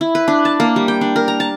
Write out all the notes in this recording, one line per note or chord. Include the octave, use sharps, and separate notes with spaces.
E4
B4
D4
A5
A#3
G3
G5
D4
A#4
A#5
A5